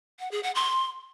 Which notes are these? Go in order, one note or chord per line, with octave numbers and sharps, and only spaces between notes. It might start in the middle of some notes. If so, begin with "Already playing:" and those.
F#5
G#4
F#5
C6